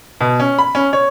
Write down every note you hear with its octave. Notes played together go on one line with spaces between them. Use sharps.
B2
C#4
B5
C#4
C#5